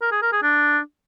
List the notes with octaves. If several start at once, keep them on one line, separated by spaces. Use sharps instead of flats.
A#4
G#4
A#4
G#4
D4